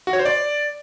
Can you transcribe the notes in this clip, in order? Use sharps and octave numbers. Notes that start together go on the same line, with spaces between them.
F#4
C#5
C5
D5